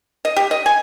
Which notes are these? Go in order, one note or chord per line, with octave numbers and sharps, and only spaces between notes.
D#5
G4
D#5
G#5